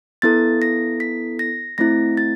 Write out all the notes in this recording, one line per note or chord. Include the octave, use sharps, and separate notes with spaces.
B3 E4 A4 A6
A#6
B6
A#6
A3 C4 E4 A#6
A6